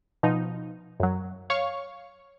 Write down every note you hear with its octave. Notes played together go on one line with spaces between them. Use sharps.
B2 F3 D#4
F#2 F#3
C#5 F5 C#6